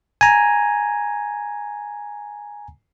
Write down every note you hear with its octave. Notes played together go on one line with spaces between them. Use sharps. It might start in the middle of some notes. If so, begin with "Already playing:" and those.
G#5 A#5